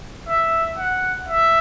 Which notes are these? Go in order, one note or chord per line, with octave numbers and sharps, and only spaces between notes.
E5
F#5
E5